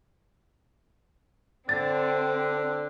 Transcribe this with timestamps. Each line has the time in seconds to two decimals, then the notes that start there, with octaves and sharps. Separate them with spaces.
1.69 D3 C4 A6